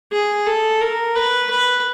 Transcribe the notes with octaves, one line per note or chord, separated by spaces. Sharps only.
G#4
A4
A#4
B4
B4